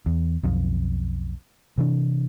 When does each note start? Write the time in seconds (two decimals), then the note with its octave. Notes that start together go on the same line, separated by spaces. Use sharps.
0.06 E2
0.43 B1 F2
1.78 C3 E3 D4